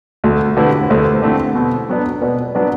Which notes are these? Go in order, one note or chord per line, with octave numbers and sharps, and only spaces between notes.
D2 F#4 A4
D3 A3 C4 E4 G4 B4
D2 A4 C5
D3 A3 C4 E4
B2
F#3 B3 D4
B2 B4 D5
F#3 B3 D4 B4 D5